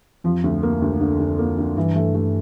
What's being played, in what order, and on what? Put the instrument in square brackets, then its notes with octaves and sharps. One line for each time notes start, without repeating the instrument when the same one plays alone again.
[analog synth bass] F2 [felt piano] F3
[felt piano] D2
A#3
D2
D3
D3
A#3
D3
[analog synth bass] G2 [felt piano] E3
[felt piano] A3
A3